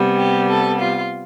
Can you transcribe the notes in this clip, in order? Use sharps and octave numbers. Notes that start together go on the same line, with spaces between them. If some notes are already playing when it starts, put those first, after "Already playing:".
Already playing: C3 G3 B3
G4
A4
F4